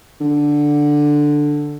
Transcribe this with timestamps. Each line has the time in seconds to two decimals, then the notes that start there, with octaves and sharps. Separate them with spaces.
0.21 D3